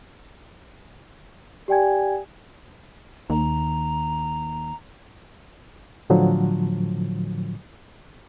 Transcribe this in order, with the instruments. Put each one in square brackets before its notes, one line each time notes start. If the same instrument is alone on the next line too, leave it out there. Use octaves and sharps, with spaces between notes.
[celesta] G4 D5 G5 G#5 G#6
[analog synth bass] D#2 [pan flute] A#5
[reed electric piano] A2 D3 F3 F#3